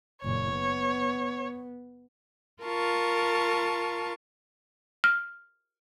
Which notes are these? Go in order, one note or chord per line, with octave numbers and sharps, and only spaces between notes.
F#1 A#2 C#5
B3
F4 A#4 A5 C#6
F6